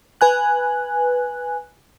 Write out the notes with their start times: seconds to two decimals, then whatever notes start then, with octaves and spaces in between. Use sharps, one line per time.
0.21 B4 G#5 F#6